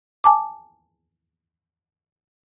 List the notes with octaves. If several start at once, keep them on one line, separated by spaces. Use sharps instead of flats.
G#5 A5 D6